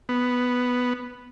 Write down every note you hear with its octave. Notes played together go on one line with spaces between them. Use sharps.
B3